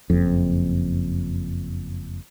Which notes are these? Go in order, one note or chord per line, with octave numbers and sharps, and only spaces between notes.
F#1 F2